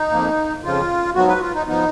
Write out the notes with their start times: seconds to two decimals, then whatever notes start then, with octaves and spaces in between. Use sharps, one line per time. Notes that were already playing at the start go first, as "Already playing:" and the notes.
Already playing: D#4
0.11 F2 F3 A#3
0.63 F2 C#3 F3 F4
1.15 G#2 F#3 B3 F#4
1.27 B4
1.35 F#4
1.41 F4
1.54 D#4
1.67 F3 B3 D#4